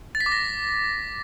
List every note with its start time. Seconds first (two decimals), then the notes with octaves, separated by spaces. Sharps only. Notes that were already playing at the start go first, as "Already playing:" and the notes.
0.15 A6
0.20 B6
0.26 D6
0.32 A#6